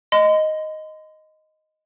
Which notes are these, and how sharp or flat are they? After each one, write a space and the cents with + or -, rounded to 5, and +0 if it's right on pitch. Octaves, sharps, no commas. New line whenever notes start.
D#5 +0 C6 -40